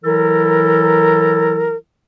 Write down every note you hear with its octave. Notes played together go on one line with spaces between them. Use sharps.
E3 F#3 E4 A4 A#4